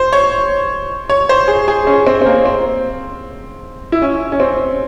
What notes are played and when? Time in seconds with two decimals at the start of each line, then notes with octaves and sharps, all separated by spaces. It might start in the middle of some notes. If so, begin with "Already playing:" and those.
Already playing: C5
0.13 C#5
1.10 C#5
1.29 C5
1.48 G#4
1.68 G#4
1.87 C#4
2.07 C4
2.22 C4
2.26 A#3
2.46 C4
3.92 E4
4.02 C#4
4.32 C#4
4.40 C4